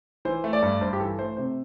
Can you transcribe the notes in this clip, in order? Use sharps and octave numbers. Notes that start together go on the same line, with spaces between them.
E3 C5
A3
D5
G2
G2 C5
G4
E3 A4
A3 C5
C3 C5